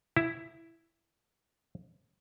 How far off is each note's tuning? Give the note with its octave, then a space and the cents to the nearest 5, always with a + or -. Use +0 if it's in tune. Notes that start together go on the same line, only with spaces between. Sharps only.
E4 +5